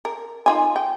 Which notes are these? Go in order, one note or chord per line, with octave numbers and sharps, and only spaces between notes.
A#4
D#4 F4 G#5
G5